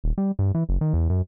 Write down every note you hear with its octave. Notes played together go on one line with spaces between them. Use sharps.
D#1
G3
G2
E3
F#1
D#3
E2
F#2